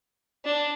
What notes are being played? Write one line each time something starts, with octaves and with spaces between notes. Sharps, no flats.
D4